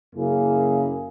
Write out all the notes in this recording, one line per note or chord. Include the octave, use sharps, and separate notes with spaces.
F#2 C#3 A#3 E4 G#4